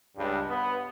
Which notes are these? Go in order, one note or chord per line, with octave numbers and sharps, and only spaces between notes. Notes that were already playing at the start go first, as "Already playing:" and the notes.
C#2 G2
B3